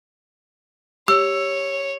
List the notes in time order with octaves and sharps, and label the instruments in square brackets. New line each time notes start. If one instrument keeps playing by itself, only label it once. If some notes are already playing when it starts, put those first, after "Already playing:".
[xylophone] G4 [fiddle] C#5 [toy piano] E6